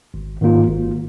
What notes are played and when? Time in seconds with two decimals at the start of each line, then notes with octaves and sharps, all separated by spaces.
0.14 G#1
0.41 G#2 D#3 A#3 F4
0.69 G#1